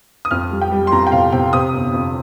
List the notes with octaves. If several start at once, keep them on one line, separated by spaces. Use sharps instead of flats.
D#6
F2 F6
G3
G5
G3
C6
F2 A#5
G5
C3 F5
C3 G5
C3 D#6
G1
F2